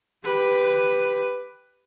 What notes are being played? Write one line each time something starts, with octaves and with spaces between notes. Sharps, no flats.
G4 B4